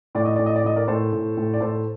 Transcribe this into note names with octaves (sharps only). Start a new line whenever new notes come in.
A2 D5
D#5
A2 D5
D#5
D5
A2 D#5
A#4 D5
A2 A4 C5
A2
A2
D5
A2 A4 C5